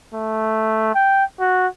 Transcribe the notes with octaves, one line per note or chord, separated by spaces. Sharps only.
A3
G5
F#4